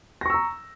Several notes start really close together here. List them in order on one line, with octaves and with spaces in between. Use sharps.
A#6 C#6 E6 A#5